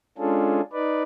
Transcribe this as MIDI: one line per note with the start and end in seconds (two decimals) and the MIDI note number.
0.18 0.61 56
0.18 0.61 61
0.18 0.61 62
0.18 0.61 65
0.18 0.61 68
0.18 0.61 69
0.73 1.03 63
0.73 1.03 71
0.73 1.03 74